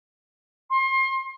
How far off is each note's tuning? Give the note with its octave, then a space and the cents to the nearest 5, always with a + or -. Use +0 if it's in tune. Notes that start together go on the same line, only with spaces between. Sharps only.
C6 +35